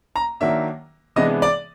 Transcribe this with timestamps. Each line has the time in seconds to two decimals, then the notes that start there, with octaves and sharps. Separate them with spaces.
0.16 A#5
0.40 D#3 F#3 A#3 D4 E5
1.16 C3 E3 G#3 B3 D4 D#5
1.42 D5